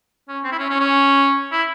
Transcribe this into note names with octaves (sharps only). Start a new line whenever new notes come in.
C#4
C4
E4
C#4
C#4
C#4
E4